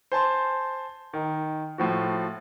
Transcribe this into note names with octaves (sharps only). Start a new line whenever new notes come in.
C5 G#5 A5 C6
D#3
A2 F3 F#4